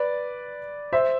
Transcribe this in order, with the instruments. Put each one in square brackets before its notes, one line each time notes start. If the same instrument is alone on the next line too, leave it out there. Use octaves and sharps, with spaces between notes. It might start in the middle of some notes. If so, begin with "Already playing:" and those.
Already playing: [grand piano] B4 D5
C5 E5